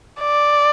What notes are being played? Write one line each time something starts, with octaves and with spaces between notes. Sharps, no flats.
D5